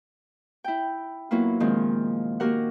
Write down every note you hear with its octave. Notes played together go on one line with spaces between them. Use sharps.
E4 G5
F#3 A#3 B3 E4 F4
A#2 D#3 F3 G#3 C4
A#3 F#4 G4 A#4 F#5